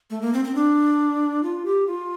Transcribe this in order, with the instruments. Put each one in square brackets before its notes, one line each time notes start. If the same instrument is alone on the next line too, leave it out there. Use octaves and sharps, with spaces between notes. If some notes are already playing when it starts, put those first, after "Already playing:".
[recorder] A3
A#3
C4
C4
D4
F4
G4
F4